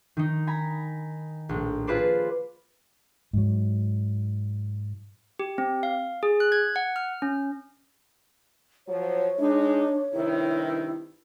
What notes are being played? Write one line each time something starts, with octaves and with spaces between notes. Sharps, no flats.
D#3 D#4
G#5 A#5 B5
A#1 A2
F4 G#4 B4 C5 D5
G#2 F#3
G4
C4
F5
G#4
F#6
G#6
F#5
F6
C#4
F3 F#3 C#5
G#3 D4 D#4
G2 C3 D#3 E4